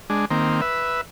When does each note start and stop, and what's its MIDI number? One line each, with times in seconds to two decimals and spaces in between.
0.10 0.25 56
0.10 0.25 62
0.31 0.61 51
0.31 0.61 58
0.31 0.61 60
0.61 1.01 71
0.61 1.01 76